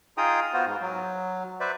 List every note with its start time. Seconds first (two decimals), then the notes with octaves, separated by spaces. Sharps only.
0.18 D#4 F4 G#4 G5 A#5 D#6
0.54 B3 F4 F#4 C5
0.66 G#2
0.81 F#3
1.60 B4 C5 D5 E5